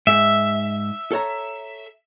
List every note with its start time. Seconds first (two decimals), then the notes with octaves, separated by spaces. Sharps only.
0.07 G#2 E5
1.12 A4 C#5 A#5